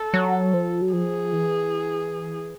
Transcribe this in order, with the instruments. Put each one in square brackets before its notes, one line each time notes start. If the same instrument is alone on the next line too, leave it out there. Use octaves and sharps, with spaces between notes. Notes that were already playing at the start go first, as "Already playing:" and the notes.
Already playing: [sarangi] A4
[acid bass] F#3
F3
F#3
[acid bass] F3 [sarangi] G#4
[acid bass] E3